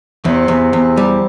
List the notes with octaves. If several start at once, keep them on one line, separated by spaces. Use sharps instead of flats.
E2 C3
E2
E2
G3